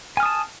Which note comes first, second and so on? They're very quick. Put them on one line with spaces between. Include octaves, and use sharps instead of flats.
G#5 F6 D#6 A5